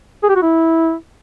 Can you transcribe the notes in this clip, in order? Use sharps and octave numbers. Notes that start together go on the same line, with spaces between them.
G#4
G4
F#4
E4